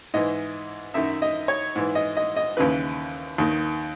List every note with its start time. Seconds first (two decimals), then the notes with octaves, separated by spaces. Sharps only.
0.14 G#2 E3 D#5
0.94 F#2 D#3 E5
1.22 D#5
1.48 C#5
1.76 G#2 E3
1.95 D#5
2.17 D#5
2.37 D#5
2.57 D#2 C#3 E3 B4
3.38 D#2 D#3